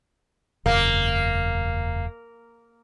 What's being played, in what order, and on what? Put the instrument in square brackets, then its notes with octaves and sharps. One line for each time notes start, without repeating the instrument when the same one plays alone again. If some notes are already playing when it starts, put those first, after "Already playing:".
[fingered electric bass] E1 F#2 C#3 [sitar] A#3